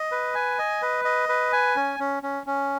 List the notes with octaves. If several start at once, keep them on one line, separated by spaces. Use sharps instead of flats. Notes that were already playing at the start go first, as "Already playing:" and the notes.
Already playing: D#5
B4
G#5
D#5
B4
D#5
B4
G#5
C#4
C#4
C#4
C#4